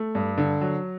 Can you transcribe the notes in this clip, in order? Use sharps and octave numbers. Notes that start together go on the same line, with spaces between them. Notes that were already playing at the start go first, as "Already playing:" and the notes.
Already playing: A3
G2
D3
F#3